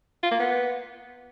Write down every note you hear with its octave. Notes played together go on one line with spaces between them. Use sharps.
F4
A#3
B3